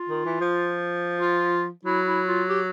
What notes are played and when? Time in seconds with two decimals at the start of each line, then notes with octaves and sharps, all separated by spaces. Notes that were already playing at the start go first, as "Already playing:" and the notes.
Already playing: F4
0.09 D#3
0.25 E3
0.41 F3
1.21 F4
1.85 F#3 E4
2.06 E4
2.28 F4
2.49 G4